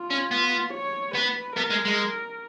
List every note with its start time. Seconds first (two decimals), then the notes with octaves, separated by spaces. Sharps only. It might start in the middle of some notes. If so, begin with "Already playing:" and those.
Already playing: F4
0.10 C#4
0.31 B3
0.74 C#5
1.15 B3 B4
1.57 B3 A#4
1.70 G#3
1.85 G#3